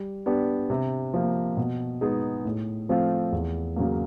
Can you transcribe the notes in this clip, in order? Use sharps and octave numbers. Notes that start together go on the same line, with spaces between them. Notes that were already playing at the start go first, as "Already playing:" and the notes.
Already playing: G3
B3 D4 G4
C3
F3 A#3
B2
G#3 B3 D#4 G#4
A2
F3 A3 C4 F4
E2
C#3 F#3 A#3